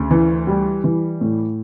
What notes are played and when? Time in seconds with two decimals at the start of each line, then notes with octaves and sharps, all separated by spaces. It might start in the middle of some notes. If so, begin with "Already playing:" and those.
Already playing: D2 C#3
0.11 E3
0.47 G3
0.84 E3
1.21 A2